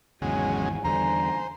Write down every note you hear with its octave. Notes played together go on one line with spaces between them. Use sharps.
G#1 E2 C#3 F#3 G#3 G#5
E2 D3 G3 C5 G#5 A#5